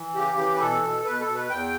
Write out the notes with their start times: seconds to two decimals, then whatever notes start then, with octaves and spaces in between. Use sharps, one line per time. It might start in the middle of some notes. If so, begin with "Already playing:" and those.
Already playing: E3
0.15 C#3 G4
0.38 E3
0.55 B4
0.60 B2 A4
0.83 B2
1.05 B2 B4
1.20 A4
1.27 B2
1.35 B4
1.50 E2 G5